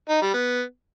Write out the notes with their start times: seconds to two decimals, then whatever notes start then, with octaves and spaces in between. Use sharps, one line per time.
0.09 D#4
0.21 G3
0.33 B3